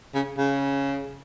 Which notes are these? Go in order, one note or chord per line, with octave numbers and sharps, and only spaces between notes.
C#3
C#3